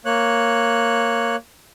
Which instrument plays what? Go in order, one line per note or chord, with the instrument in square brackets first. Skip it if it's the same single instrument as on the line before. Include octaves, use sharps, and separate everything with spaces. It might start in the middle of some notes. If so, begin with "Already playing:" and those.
[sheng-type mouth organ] A#3 C#5 F#6